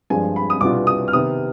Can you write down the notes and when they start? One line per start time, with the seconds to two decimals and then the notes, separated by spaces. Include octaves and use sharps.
0.10 G2 F3 G#3 D4 G#5
0.36 B5
0.50 D#6
0.61 C2 B2 B3 D4 F4 D6
0.87 D#6
1.08 F6
1.13 C3 D#3 B3 D#6